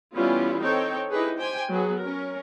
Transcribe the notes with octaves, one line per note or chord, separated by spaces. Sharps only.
E3 G3 B3 C#4 E4 F4
C4 D#4 A4 C#5 G5
D#4 E4 G4 G#4 B4
G4 C5 G5 G#5
F#3 B3 G#4
C#4 A#4